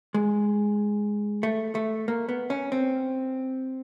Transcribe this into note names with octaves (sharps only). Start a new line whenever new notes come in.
G#3
A3
A3
A#3
B3
C#4
C4